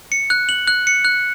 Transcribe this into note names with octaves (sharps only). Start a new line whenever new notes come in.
C#7
F#6
F#7
F#6
C#7
F#6